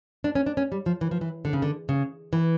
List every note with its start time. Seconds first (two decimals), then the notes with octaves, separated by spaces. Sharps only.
0.24 D4
0.35 C#4
0.46 D4
0.57 C#4
0.72 G3
0.86 F3
1.01 E3
1.11 F3
1.21 E3
1.45 D3
1.53 C#3
1.62 D3
1.89 C#3
2.33 E3